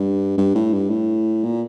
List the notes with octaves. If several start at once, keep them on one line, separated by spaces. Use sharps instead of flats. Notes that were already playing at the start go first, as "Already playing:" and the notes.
Already playing: G2
G2
A2
G2
A2
A#2